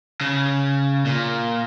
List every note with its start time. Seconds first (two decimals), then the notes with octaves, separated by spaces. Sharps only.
0.21 C#3
1.05 A#2